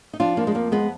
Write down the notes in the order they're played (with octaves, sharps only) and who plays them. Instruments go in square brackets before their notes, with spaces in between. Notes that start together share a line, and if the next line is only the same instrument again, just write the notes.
[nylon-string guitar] D#4
F3 D4 F4
A#3 D4
G#3
F2 A#3
G#3 B3